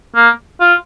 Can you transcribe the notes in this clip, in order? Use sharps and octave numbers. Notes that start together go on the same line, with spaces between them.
A#3
F4